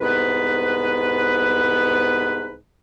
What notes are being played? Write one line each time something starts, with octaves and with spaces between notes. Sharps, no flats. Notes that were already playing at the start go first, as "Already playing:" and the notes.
C2 G#2 B3 B4